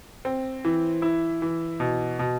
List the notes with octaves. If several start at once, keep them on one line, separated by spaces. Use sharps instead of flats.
C4
E3
E4
E3
B2
B2